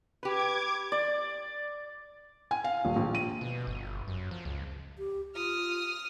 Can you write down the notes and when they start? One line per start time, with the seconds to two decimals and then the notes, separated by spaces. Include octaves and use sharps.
0.23 G4 B4 D6 G#6
0.92 D5
2.51 G#5
2.64 F5
2.85 D#1
2.96 A#1
3.15 D#7
3.41 B2
3.67 G1
4.08 F#2
4.31 F3
4.45 C#2
4.98 G4
5.35 F4 D#6 F6